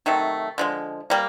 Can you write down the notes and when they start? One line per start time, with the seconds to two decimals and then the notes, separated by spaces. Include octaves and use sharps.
0.06 C3 D#3 F#3 A3
0.58 D3 F3 G#3
1.10 G3 A#3